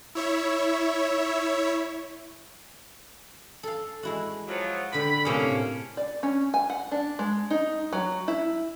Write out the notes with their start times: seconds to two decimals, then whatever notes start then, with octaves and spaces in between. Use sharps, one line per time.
0.15 E4 C#5 E5
3.63 A4 F5
4.03 G#3 E4 F#4
4.48 F3 F#3
4.93 D3 G5 B5
5.25 A2 C3 A#3 C#4 G#4
5.97 D5
6.23 C#4
6.54 G#5
6.70 F#5
6.92 D4
7.19 G#3
7.50 D#4
7.93 F#3
8.28 E4